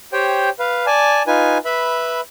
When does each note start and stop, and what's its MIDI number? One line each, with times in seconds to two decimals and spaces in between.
0.13 0.49 67
0.13 0.49 72
0.13 0.49 73
0.13 0.49 79
0.59 0.86 71
0.59 0.86 77
0.86 1.23 74
0.86 1.23 80
0.86 1.23 81
1.27 1.58 63
1.27 1.58 65
1.27 1.58 71
1.27 1.58 80
1.65 2.21 71
1.65 2.21 76
1.65 2.21 83